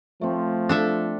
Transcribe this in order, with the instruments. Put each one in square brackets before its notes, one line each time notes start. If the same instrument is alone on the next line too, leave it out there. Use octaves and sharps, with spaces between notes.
[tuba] F3 [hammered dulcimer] A3 C4
[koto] D4 A4 E5